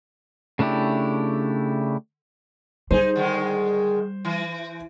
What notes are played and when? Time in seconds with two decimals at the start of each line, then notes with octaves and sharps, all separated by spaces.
0.59 C#3 A3 D4 E4 G4
2.91 G3 D#4 G#4 C5
3.16 D3 D#3 G#3
4.25 E3